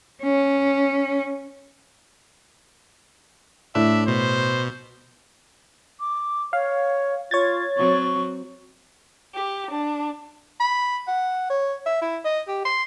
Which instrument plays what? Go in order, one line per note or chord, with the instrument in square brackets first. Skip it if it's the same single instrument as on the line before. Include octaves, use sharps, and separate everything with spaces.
[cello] C#4
[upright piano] A2 [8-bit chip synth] D4 [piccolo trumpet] E5
[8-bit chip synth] B2 [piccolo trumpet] C5
[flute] D6
[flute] C#5 [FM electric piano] F5
[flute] F4 [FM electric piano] C#5 G#6 A6
[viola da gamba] F#3 C4 [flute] C#6
[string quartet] G4
D4
[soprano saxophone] B5
F#5
C#5
E5
E4
D#5
G4
C6